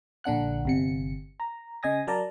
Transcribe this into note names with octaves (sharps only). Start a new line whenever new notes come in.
A#1 D3 D4 F#5 F#6
G1 C3 C#7
A#5
C#3 D#5 G#5 D#6 A#6
F#3 A#4 D5 A5 A#5